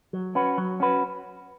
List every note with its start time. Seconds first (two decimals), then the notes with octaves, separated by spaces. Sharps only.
0.13 F#3
0.35 C#4 F#4 B4
0.58 F#3
0.80 C#4 F#4 B4